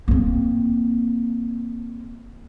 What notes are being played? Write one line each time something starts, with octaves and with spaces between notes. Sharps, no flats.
A#3 C4